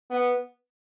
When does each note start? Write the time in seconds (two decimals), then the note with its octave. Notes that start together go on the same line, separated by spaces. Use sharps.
0.10 B3